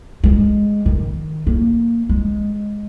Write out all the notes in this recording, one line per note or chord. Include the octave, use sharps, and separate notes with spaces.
G#3
D#3
A#3
G#3